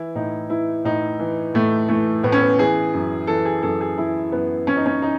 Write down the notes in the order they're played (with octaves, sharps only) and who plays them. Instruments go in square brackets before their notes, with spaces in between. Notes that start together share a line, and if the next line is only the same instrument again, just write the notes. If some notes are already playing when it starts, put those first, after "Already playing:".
Already playing: [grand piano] E3 E4
A2 D#4
E3 E4
A2 D#4
E3
A2 A3
E3 A3
A2 B3
C#4
B3
E3 G#4
F#2
E3 A4
G#4
F#2 A4
G#4
E3 E4
F#2 B3
E3 C#4
D#4
C#4
D#4